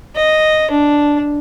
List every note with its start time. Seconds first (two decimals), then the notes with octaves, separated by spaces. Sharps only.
0.16 D#5
0.71 D4